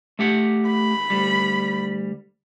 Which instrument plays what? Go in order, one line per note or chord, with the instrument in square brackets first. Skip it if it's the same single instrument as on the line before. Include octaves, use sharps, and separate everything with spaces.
[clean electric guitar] A3 G4 F#5
[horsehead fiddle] B5
[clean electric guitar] D2 G3